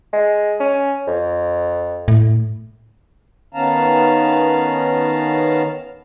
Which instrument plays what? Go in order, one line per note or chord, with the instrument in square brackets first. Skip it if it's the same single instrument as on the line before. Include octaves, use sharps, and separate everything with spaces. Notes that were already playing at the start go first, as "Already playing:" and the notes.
[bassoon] G#3
C#4
F2
[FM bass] A2
[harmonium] D#3 B3 C#4 F5 A5 A#5